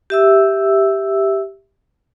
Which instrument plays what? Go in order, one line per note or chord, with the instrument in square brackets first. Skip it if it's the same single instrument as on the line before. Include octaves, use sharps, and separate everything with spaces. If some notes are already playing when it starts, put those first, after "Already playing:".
[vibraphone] G4 E5 E6